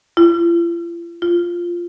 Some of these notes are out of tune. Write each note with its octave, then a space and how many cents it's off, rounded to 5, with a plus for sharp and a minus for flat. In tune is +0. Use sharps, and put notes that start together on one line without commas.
F4 -45
F4 -5